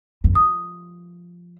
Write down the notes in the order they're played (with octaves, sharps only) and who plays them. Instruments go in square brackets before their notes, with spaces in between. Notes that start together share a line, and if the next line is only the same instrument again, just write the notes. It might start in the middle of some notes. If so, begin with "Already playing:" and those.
[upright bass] G1 F2
[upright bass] F3 [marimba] D#6